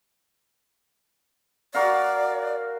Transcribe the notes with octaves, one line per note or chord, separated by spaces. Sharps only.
F#4 A#4 D5 F5